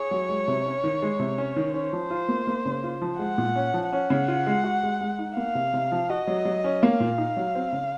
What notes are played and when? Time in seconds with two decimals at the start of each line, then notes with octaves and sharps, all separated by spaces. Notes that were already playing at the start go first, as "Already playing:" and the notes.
Already playing: G#4 C#5
0.11 F#3
0.29 G#3
0.48 C3
0.66 C#4
0.84 D#3
1.02 G#3
1.19 C3
1.38 C#4
1.56 D#3
1.74 C#4 C5
1.93 F3
2.11 F4
2.28 A#3
2.47 A#3
2.65 C#3
2.84 F4
3.02 F3
3.19 G#3 F#5
3.38 A#2
3.56 C#4
3.74 F3
3.92 C#4 F#5
4.10 C#3
4.28 F4
4.47 G#3
4.64 F#4
4.83 G#3
5.01 G#3
5.19 D#4
5.37 A#3 F5
5.55 C3
5.73 C3
5.92 F3
6.10 F#4 D#5
6.27 F#3
6.45 F#3
6.64 C#4
6.82 A#3 F5
7.00 A#2
7.18 D#4
7.36 F#3
7.55 C4
7.72 C#3